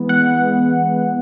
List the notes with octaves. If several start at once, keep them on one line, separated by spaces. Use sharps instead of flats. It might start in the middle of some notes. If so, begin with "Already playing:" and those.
Already playing: E3 G#3 B3
F#5